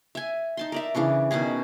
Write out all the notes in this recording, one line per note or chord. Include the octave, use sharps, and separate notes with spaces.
E5 G#5
D#4 A5 C6
A#4 D5 E5
C#3 E3 D4 C#6
B2 D#3 C#4 G#4